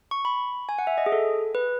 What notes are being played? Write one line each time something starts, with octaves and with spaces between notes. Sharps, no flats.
C#6
B5
G#5
F#5
E5
D#5
G#4
A4
B4